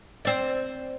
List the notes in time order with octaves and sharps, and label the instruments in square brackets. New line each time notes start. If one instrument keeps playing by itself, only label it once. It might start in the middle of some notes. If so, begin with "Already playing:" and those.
[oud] C4 D5